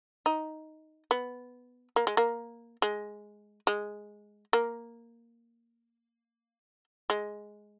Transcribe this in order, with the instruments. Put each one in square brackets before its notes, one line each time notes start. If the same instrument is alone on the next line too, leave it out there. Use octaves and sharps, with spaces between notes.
[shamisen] D#4
B3
A#3
G#3
A#3
G#3
G#3
A#3
G#3